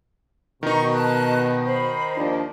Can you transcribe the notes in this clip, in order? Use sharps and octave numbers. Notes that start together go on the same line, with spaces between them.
B2 D#3 D#4 A#5 C#6
A5 F#6
C5 B5
D#2 F3 D4